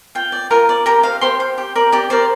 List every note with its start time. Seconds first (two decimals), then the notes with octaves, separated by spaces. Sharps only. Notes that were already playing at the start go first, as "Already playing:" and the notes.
0.15 F4 G5
0.32 D5
0.51 F4 A#4 A#5
0.69 D5
0.86 G4 A#4 A#5
1.03 C5 F5
1.21 G4 C5 C6
1.40 C5
1.58 G4
1.75 A#4 D5
1.92 G4 D5 D6
2.10 A#4 C5 D5 C6